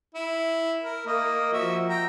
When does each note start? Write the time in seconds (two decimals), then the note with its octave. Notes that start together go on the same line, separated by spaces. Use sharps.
0.15 E4
0.83 A#4
1.07 A#3 D#5
1.53 F3 F#4 E5
1.89 G5 A#5